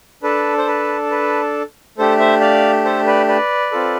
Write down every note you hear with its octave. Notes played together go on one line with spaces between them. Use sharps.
D4 A4 B4
C5
B4
B4
A3 D4 G4 A4 C5
C5 E5
D5 F5
A4 C5
B4 D5
B4 D5
C4 F4 A4